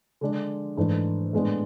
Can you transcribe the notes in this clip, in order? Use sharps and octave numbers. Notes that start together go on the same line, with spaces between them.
D3 G#3 D4
G#2 E3 A3 D4
A2 G#3 B3 D4